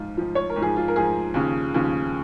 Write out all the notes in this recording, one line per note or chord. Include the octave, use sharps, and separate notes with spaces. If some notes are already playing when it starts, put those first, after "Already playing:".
Already playing: G#2 F3 F4
G#2 F3
C#5
A#4
G#2
F3 G#4
F4
A#4
G#2 F3 G#4
D#2 C#3 F3
D#2 C#3 F3